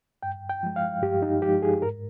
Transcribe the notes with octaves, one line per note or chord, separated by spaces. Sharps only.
G2 G5
G5
F3 G#3
F5
G2 G4
D#4
F3 G#3 G4
G#4
G#2 A#4